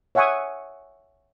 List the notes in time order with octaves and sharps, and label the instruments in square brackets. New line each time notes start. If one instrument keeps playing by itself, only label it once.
[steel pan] C#5 E5 F#5 G#5 C#6 D#6